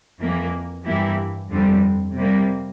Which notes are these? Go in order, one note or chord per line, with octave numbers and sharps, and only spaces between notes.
F2 E3 A#3
G2 E3 A#3 E4 G4
F2 D3 G3 C4
C3 G3 A#3